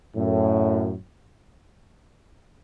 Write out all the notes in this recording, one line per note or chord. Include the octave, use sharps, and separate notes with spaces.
F#2 A2